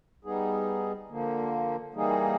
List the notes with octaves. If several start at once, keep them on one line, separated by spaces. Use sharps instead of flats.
G3 B3 D#4 G#4
D3 F3 A#3
E3 G3 A#3 D#4 G#4